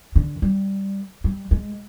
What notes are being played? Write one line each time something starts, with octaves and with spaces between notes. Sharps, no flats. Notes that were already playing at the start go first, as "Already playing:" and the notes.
D3
G3
G3
G#3